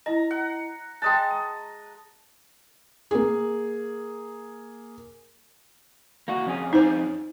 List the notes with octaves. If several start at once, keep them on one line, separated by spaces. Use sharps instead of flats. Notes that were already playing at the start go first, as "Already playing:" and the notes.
E4 D#5 A#5
F#5
G#3 D#5 G5 A5 D#6 F#6
A#5
A#3 G#4
A#3 F#4
F2 C#4 G#4
D#4 C5